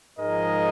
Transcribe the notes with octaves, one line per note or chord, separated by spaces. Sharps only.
G#2 F3 G#3 A#4 D#5